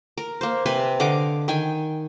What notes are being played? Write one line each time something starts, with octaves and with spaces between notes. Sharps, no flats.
A#4
A#3 C5
C3 B4 C5 G#5
D3 D#5 F5 D6
D#3 G5 G#5